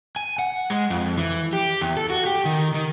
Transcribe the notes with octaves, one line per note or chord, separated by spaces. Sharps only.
G#5
F#5
G#3
F2
E3
G4
E2
A4
F#4
G4
D#3
D#3